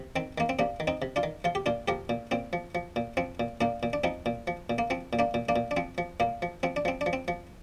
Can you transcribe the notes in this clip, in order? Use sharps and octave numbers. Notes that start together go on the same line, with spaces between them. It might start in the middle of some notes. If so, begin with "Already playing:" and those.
Already playing: C3
D#3 C4
D#3 A#3
C4
C3 A#3 D4
D#3
C4 D#4
C3
D4 F4
D#3
F3 F4
G4
A#2 D4 F4
F3 G4 A#4
A#2
A#2 C4
F3
F3
A#2
F3 C4
A#2
A#2 A#3 D4
A#2
D4
F3 C4 D#4
A#2
F3
A#2
A#3
F3 C4
A#2
A#3 D4
A#2
A#3 D4
A#2
D4
F3 C4
F3
A#2 A#3
F3
F3 C4
D4
F3 C4
D4
F3
C4
F3